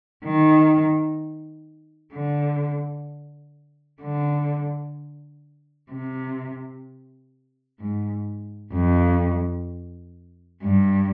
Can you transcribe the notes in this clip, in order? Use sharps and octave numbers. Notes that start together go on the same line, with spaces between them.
D#3
D3
D3
C3
G#2
F2
G2